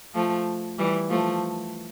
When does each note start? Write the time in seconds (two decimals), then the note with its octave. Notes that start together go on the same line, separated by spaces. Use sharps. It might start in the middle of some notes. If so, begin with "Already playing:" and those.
0.14 F3 A3
0.78 E3 G3
1.09 F3 A3